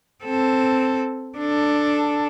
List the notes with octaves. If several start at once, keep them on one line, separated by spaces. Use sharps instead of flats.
C4 A4
D4 A4